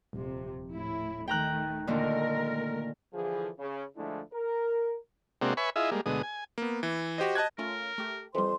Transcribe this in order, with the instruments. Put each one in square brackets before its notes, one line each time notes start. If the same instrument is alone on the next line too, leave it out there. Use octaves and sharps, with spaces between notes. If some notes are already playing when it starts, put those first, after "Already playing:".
[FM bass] D#1 [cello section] F2 C3
[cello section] A2 E4
[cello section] D#3 A3 [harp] G5 A#5 F#6
[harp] A#2 D3 D#3 [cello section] A3 A#4
[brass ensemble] D3 E3 F3 G#4
C#3
D3 F3 G#3 A3 D4 E4
A#4
[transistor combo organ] C3 G#3 A#3 C4 D4 F#4
B4 C#5 E5 G#5 B5 C#6
E4 F4 G#4 D#5 E5
G3 G#3 A#3
D2 B2 G#3 D#6
G#5
[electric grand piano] A#3 B3
E3
F#4 G4 C5 D#5
D#5 A5 F#6 G#6
[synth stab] A3 C#4 F4 [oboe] A#4
[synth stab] A3 G4
[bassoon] F2 [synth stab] E3 G3 [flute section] C5 C6